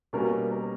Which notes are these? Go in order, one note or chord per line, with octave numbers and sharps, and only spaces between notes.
B2 G3 A#3 C#4 A#4
A#4